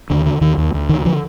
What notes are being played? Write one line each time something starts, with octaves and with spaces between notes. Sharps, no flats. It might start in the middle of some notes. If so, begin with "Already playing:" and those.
D#2 D3
D3
D#2 D#3
D#2
D2
D3 D#3
D3 F3